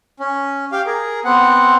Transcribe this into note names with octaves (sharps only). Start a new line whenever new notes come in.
C#4
G4 F5
G#4 A#4
B3 C4 F#5